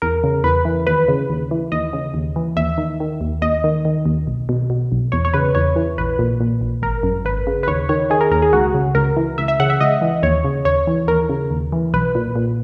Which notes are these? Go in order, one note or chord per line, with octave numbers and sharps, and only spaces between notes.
E2 A#4
C#3
E2 B4
E3
D#2 B4
C#3
D#2
E3
D#2 D#5
C#3
D#2
E3
D#2 E5
D#3
D#3
D#2
D#2 D#5
D#3
D#3
D#2
B1
B2
B2
B1
E2 C#5
C#5
C#3 B4
E2 C#5
E3
A#1 B4
A#2
A#2
A#1
G#1 A#4
F#2
G#1 B4
C#3
B4
D#2 C#5
D#3 C#5
D#3 G#4
A#4
D#2 A#4
G#4
C#2 F#4
C#3
C#2 A#4
E3
C#2 E5
E5
C#3 F#5
E5
C#2 D#5
E3
D#2 C#5
C#3
D#2 C#5
E3
D#2 A#4
C#3
D#2
E3
B1 B4
A#2
A#2